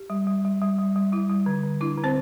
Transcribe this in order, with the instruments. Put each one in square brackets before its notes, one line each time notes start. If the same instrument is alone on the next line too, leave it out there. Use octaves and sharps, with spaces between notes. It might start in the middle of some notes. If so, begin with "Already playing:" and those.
Already playing: [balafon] G4
G3
G3
G3
G3
G3
G3
G3 E4
G3
D3
D3
D4 E4
D3
C4 C5